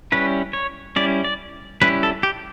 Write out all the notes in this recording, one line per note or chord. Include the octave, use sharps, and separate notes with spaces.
G3 C#4 E4 B4
C#5
G3 C#4 E4 D5
D5
G3 C#4 E4 B4
A4
G4